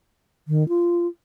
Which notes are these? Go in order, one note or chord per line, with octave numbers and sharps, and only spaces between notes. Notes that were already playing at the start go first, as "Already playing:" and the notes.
D#3
F4